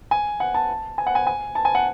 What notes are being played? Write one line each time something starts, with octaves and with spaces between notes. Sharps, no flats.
G#5
F#5
A5
G#5
F#5
G#5
G#5
A5
G#5
F#5